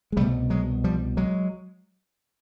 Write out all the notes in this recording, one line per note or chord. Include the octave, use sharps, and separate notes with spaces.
G#3
C2 B2 G3 A3
F#3 G#3
F3 G3
F#3 G#3